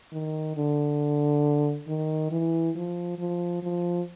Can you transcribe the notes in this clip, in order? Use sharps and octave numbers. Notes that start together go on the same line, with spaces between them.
D#3
D3
D#3
E3
F3
F3
F3